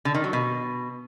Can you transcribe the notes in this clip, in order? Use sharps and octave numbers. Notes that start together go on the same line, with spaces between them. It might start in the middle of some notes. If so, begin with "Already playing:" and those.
D3
D#3
F#3
B2